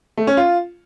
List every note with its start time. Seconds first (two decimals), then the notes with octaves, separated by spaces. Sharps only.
0.17 A3
0.27 C#4
0.37 F4